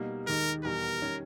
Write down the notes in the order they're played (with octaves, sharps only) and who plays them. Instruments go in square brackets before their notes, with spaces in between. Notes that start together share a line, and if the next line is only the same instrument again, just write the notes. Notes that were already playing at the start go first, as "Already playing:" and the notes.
Already playing: [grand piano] B2 G3 A#3 D#4
[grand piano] D#2 D#3 G#3 [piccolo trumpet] A#4
[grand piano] E2 B2 G3 [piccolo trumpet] A#4
[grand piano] D#3 G3 C#4